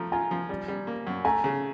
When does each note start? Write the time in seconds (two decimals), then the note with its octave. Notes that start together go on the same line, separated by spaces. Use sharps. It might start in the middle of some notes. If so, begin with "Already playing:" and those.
Already playing: F3 A3 A#5
0.12 F4 G#5 A#5
0.31 F3
0.49 G3
0.68 G3
0.87 A#3
1.07 F#2
1.25 A3 G#5 A#5
1.44 C#3